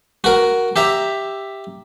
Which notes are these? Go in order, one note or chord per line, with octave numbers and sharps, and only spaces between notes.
F#4 A#4
G4 E5 A#5